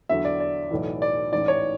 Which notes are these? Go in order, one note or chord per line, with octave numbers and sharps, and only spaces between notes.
E2 D3 F#3 E5
D5
D5
B1 A2 E3
D5
A1 G#2 E3 D5
C#5